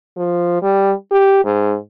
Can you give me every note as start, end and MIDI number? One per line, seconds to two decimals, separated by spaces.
0.17 0.58 53
0.62 0.92 55
1.11 1.40 67
1.45 1.75 44